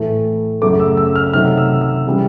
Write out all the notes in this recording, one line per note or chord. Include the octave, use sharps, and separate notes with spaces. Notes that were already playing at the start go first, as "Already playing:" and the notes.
Already playing: A2 E3 A3
F#2 C#3 F#3 A3 D6
E6
E6
F6
C3 D#3 F#3 A3 F6
E6
E6
C#3 E3 G3